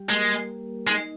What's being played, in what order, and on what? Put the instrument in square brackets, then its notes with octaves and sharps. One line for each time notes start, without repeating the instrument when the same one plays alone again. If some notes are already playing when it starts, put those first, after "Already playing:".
Already playing: [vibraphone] G3 G4
[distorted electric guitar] G#3 [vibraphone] A#3 A#4
[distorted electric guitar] G#3 [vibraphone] D#4 D#5